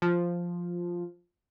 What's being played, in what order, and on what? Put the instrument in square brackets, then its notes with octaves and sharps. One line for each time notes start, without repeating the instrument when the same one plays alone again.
[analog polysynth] F3